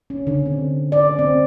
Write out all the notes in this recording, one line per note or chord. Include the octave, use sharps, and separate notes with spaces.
C#4
D3
C4
D5
C4